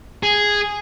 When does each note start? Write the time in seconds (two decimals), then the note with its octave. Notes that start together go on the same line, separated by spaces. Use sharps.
0.23 G#4